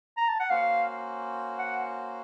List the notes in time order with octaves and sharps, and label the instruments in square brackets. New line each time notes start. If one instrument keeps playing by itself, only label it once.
[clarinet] A#5
A5
F#5
[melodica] A#3 C#4 F#4 C5 [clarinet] F5
[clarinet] F#5